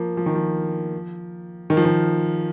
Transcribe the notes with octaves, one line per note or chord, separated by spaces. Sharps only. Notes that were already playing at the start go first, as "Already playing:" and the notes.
Already playing: F3 A#3
F3
D#3
F3
D#3
F3
D#3